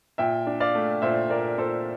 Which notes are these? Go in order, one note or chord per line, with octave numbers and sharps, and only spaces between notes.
A#2 E5 G5
D4
D5 F5
A3
A#2 C5 E5
A#2 A#4 D5
A#2 A4 C5